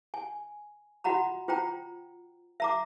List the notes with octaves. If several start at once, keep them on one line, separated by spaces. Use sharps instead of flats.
G#5
F4 F#4 D#5 F#5 A#5 B5
F4 C5 G5 A#5
E5 A#5 D6